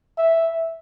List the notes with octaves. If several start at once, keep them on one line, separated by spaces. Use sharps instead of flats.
E5